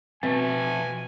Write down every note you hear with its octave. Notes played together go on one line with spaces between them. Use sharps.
F2 B2 C4 E5 G#5 A5